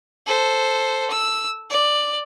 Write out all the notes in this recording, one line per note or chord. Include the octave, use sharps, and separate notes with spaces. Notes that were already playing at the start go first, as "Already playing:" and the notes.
A4 C5
E6
D5